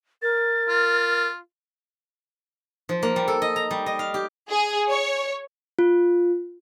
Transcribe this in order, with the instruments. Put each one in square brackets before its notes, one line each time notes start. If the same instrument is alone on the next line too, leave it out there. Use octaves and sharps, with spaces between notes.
[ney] A#4 [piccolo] A6
[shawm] F4
[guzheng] F3
A#3
G3
A4
D#5
A#5
G3
D#5
F5
G4
[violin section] G#4
C#5
[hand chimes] F4